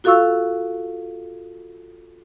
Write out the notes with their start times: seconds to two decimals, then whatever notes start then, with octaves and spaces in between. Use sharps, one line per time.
0.04 F4 F#4 A4 F5 C#6 E6